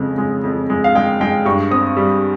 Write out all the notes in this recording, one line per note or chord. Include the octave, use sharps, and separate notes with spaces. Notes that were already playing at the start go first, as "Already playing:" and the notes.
Already playing: F2 C#3 G#3
G#3
F2
G#3
F5
G#3 G5
G#3 G5
G2 C#6
C4 D#6
G3